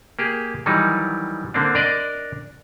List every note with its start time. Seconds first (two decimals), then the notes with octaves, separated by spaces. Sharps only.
0.19 A#3 G4 G#4
0.66 D#3 E3 F#3 G3 D#4
1.54 D3 A#3 C4 D4
1.75 D4 A#4 D5 D#5